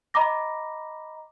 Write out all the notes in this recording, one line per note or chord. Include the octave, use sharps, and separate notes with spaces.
D#5 A#5 B5 D6 A#6